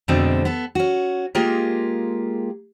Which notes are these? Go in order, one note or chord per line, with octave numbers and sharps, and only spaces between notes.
F2 B2 D3 G#3 A3 C4
B3 A4
C#4 F#4
G#3 A#3 F4 G4 G#4 A#4